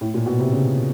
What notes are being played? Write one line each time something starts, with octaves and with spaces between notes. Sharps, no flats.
A2
A#2
B2
C3
C#3